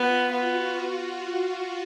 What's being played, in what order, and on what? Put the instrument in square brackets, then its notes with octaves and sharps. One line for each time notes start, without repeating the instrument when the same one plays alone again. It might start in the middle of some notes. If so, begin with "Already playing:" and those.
Already playing: [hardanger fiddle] B3 [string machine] F4
[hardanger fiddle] B3 [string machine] F#4